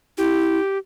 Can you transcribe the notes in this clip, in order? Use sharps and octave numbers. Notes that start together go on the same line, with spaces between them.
E4 G4